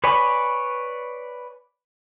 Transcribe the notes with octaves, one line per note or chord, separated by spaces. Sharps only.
B4 C#5 D5 G#5 B5